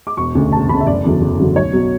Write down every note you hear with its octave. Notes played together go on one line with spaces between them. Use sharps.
D6
E1 C#6
D2 C#3
E1 A5
D2 C#3 B5
E5
F#1 D5
E2 D3 F#3
F#1
E2 D3 F#3
B1 C#5
B2 F#3